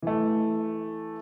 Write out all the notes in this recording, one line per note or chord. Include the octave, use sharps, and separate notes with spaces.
E3 A3